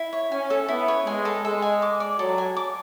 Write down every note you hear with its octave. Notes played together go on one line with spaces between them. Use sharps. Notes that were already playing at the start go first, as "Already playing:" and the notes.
Already playing: E4
C#5
C#4 G#5
A4
B3 E4
C#5
G#3 G#5
A4
G#3 A4
G#5
D6
D5
F#3 A4
G#5
D6